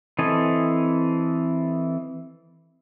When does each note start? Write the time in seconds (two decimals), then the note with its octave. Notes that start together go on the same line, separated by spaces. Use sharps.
0.19 E3 C4 A4 D#5 G#5